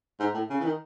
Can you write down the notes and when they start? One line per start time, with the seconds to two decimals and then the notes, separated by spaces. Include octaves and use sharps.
0.19 G#2
0.34 A2
0.50 C#3
0.60 E3
0.65 D#3